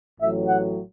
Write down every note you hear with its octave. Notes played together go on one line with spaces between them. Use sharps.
A1 A2 F#3 E5
F#5